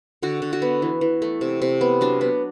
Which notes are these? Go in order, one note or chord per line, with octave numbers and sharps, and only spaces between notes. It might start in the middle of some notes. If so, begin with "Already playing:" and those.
D3 F#4
D3
F#4
B3
E3
E3
A3
C3
C3
B3
F#3 D4
B3